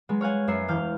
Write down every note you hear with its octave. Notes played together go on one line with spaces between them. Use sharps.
F#3 G#3 B3
C#5 F5 F#5 G#5
F#2 B3 E5 C7
E1 E3 F5 F6 G6